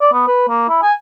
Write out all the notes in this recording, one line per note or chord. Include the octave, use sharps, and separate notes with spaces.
D5
B3
B4
A#3
E4
G#5